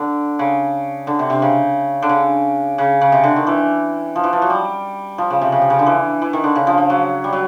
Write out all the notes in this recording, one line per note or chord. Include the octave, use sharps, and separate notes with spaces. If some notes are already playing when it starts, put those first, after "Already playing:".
Already playing: D3
C#3
D3
C3
C3
C#3
D3
C#3
C#3
C#3
C3
D3
D#3
E3
F3
E3
F3
F#3
G3
F3
C#3
C3
C#3
C3
C#3
D3
E3
E3
D#3
D3
C#3
F3
F3
F#3
G3
F#3